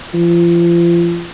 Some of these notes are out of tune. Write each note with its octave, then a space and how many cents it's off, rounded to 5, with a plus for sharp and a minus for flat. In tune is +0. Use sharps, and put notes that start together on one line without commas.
F3 -35